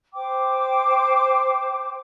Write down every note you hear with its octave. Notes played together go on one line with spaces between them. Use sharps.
C5 G5 D6